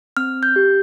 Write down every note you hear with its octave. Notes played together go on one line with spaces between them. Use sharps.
C4 F6
G6
G4